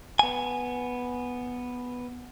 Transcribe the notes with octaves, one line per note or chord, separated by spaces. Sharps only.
B3 G#5